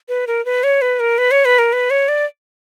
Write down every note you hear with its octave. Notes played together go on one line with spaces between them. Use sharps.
B4
A#4
B4
C#5
B4
A#4
B4
C#5
B4
A#4
B4
C#5
D5